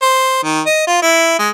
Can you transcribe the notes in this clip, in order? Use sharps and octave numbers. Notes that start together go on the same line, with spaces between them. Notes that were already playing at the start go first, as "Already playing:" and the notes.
C5
D#3
D#5
F4
E4
G#3